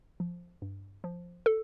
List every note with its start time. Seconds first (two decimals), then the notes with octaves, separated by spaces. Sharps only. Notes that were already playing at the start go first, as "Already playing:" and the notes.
0.20 F3
0.62 G2
1.04 F3
1.46 A4